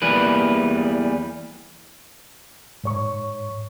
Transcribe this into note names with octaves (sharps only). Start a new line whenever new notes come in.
E2 E3 G3 A#3 B4
G#2 C#5 C#6